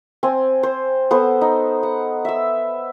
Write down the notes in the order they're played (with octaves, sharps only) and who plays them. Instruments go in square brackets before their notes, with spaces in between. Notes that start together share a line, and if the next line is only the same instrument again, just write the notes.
[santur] C4 G#5
C5
B3 A4 C5
D#4
F#5
E5 E6